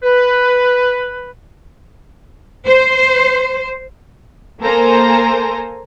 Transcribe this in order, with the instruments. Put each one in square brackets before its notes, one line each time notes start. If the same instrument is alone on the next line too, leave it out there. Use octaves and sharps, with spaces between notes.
[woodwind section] B4
[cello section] C5
[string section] A#3 A4 A#4 C5 G#5 A#5